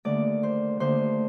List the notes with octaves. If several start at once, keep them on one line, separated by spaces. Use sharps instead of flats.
D#2 D3 A3 D5
C5
D#2 D3 A3 C5